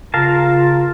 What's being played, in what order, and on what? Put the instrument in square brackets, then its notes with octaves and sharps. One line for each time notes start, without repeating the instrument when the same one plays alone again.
[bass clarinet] C#3 [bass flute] F4 [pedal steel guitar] A#4 F5 A5